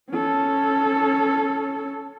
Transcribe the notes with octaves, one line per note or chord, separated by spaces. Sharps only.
C#4 A4